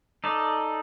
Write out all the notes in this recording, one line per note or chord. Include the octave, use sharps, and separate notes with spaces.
D#4 A4 D5